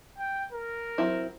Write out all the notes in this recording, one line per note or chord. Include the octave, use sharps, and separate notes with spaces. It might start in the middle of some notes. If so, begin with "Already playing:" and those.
G5
A#4
F#3 C4 E4